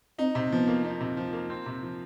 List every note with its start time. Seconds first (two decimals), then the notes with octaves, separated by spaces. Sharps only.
0.19 C4 D#4
0.35 C3
0.52 F3 B3
0.68 A#3
0.84 D#4
1.01 C3
1.17 F3
1.33 A#3
1.50 C4
1.66 C3
1.82 F3